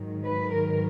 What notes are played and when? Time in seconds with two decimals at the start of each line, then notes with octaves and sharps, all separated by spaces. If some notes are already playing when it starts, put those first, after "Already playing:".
Already playing: G#2 D#3 F#3
0.24 B4
0.53 A#4